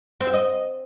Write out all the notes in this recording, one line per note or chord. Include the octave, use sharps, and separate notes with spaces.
C4
E5
D#5